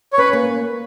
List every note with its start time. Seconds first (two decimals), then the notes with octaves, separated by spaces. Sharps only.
0.13 C#5
0.18 C#4 B4
0.33 A#3